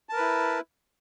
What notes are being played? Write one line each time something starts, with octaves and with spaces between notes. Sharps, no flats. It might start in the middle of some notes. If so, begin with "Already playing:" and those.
E4 A#4 B4 A5